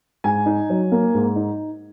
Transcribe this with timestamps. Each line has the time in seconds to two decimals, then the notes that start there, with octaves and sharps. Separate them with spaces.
0.24 G#2 G#5
0.46 D#4
0.70 F#3
0.92 A#3
1.15 G#2
1.36 D#4